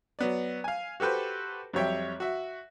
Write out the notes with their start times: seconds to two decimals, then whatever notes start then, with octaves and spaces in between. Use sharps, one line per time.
0.19 F#3 B3 D5
0.64 F5 G#5
1.00 F#4 G4 A4 B4 C5
1.73 F2 F#3 G3 C#5 E5 G5
2.20 F#4 E5